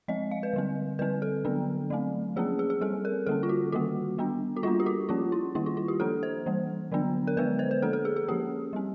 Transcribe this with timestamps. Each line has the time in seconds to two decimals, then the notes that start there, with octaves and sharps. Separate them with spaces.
0.08 F3 G#3 C4 D#5
0.31 F5
0.43 B4
0.53 D3 G3 C4
0.99 D3 G3 C4 B4
1.22 A4
1.44 D3 F#3 B3 D4
1.90 F#3 A3 C4
2.36 F3 A#3 C#4 G#4
2.59 G#4
2.70 G#4
2.81 G3 C4 A4
3.05 A#4
3.26 D3 G3 A#3 C#4 A4
3.43 F4
3.49 F#4
3.72 D#3 G3 A#3 F#4
4.18 G3 B3 D4
4.56 F#4
4.63 G3 A#3 D4 F4
4.80 G4
4.86 F#4
5.09 F3 A#3 C#4 F4
5.32 E4
5.55 D#3 G3 A#3 E4
5.66 F4
5.77 F4
5.88 G4
6.00 F3 A#3 D4 A4
6.23 C5
6.46 E3 G3 A#3
6.92 D3 F#3 B3 D4
7.27 A#4
7.37 D3 F3 G#3 B3 B4
7.59 C5
7.71 B4
7.82 F3 A#3 D4 A4
7.93 A4
8.05 G#4
8.16 G#4
8.28 F3 A#3 C#4 G4
8.73 G3 C4